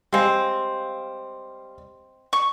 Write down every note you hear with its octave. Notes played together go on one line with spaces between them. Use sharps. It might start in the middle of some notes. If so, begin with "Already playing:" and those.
G3 G#3 C4 F5 C7
C#6